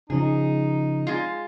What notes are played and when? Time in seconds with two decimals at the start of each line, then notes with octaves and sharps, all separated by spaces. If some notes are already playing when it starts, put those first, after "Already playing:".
0.10 C#3 F3 D#4 G#4
1.07 G#3 F4